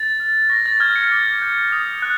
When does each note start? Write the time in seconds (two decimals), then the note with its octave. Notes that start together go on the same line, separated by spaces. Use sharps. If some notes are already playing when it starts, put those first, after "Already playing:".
Already playing: A6
0.20 F6
0.50 C#6 A#6
0.66 A6
0.80 F6 G#6
0.96 C#7
1.12 D6
1.42 G6
1.72 D#6
2.02 F#6